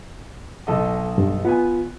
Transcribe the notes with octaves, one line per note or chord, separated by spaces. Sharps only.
B1 A4 D#5
G2
B3 F4 G#5